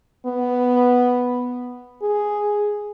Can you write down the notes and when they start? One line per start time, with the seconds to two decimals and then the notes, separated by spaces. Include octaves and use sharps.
0.26 B3
2.02 G#4